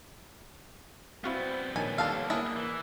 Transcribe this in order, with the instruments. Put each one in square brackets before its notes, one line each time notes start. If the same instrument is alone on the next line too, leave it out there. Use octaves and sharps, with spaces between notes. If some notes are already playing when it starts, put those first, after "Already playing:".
[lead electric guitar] G3 B3 [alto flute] C4 [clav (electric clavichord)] E4 F#4 F5
[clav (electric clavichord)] A#1 D#3 A5 [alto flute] C#5 [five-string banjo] G#5
[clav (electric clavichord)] D#2 [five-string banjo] D4 A4 F5
[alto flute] A#3 [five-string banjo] D4 E4 G#4
[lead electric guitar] E3